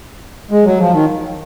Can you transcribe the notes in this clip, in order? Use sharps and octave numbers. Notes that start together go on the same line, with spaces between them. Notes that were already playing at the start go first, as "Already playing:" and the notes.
G#3
F#3
F3
D#3